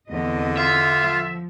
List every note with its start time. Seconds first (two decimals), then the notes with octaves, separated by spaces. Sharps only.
0.10 E2 D3 C4 D#5
0.57 F4 E5
1.01 F3